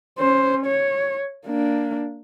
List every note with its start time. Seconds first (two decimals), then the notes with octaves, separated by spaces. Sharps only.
0.19 C#4 C5
0.66 C#5
1.46 A#3 D4